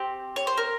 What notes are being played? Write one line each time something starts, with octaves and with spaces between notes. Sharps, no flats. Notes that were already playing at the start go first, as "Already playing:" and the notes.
Already playing: C4 G4
C#5
C5
A#4